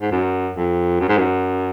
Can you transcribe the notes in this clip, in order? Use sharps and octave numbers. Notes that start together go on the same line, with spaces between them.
G#2
F#2
F2
F#2
G#2
F#2